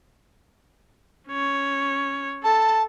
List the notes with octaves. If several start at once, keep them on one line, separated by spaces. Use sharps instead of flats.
C#4 C#5
A4 A5